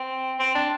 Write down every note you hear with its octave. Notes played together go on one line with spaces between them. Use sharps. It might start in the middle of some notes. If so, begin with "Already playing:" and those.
Already playing: C4
C4
D4